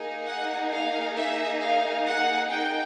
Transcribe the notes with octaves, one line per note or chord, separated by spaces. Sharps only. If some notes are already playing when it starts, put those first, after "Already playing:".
Already playing: A#3 D#4 G#4
F#5
F5
E5
F5
F#5
G5